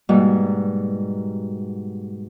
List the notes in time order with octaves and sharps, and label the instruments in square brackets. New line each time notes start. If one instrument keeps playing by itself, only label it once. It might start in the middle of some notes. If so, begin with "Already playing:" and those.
[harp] G#2 B2 G3 A#3 F#4